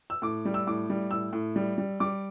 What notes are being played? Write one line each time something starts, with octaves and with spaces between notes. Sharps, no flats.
E6
A2 D6
G3
E6
A2 D6
G3
A2 E6
A2
G3
G3
G3 D6